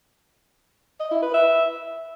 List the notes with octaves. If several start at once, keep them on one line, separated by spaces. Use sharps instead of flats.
D#5
E4
B4
E5